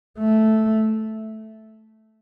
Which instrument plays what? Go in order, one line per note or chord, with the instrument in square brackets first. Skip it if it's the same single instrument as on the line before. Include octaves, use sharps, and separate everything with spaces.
[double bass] A3